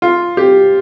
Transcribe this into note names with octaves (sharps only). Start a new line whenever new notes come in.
F4
G4